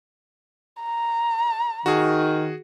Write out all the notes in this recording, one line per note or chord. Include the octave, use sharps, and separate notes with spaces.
A#5
D#3 F#4 G#4